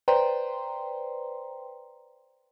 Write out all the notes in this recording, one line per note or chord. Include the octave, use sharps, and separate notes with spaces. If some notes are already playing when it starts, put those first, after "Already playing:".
B4 C5 D5 G5 A#5 C6